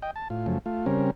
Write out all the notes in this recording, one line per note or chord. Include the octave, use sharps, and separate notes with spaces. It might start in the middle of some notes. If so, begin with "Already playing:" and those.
D#5 G5
A5
A2 F4
F#2 C#3 F3 A3
A3 F4
C#3 G3 C4 C#4 A#4